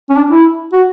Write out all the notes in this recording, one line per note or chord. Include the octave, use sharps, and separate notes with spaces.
C#4
D4
E4
F#4